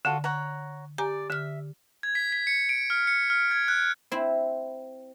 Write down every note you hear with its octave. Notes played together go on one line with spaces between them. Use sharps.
D3 F4 F#4 A4
C#5 F#5 A#5
G4 D5 G#5 A#5
D3 E5 F6
G#6
B6
B6
C#7
D7
F6
C#7
F6
G#6
F#6
C4 E4